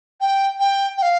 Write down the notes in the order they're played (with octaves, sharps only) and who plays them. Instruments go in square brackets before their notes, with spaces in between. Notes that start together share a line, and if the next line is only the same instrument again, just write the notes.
[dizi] G5
G5
G5
F5